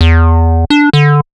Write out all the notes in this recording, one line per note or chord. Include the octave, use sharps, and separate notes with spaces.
E2
D4
D3